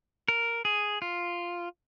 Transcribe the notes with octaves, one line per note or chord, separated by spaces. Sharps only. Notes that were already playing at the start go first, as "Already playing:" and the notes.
A#4
G#4
F4